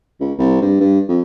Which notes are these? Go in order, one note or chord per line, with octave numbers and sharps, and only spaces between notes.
C#2
C2
G2
G2
F2